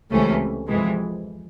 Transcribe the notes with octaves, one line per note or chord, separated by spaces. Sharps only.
C#2 C3 E3 A3 C#4
F2 C3 E3 G#3